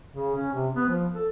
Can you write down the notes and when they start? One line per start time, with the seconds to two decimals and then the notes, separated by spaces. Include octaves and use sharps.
0.14 C#3
0.35 C#4
0.53 C3
0.76 B3
0.89 F3
1.14 A4